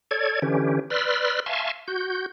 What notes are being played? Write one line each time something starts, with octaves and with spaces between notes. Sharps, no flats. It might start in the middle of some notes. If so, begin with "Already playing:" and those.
A4 C#5 D5 G#6
D3 E3 C#4 G4
B4 D5 B5 C6 E6 F6
E5 F5 G#5 A5 C6 C#6
F#4 G6